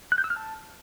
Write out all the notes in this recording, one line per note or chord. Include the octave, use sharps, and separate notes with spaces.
F#6
G6
E6
F6
A5